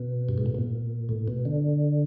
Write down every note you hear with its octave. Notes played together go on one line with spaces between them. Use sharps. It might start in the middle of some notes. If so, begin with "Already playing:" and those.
Already playing: B2
G2
G#2
A2
A#2
A2
B2
D3